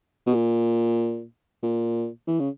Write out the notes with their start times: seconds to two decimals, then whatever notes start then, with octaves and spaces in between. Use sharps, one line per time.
0.26 B2
0.34 A#2
1.63 A#2
2.27 E3
2.40 C#3